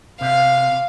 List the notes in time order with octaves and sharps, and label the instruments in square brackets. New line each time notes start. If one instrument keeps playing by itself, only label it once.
[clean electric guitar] C3 [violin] F5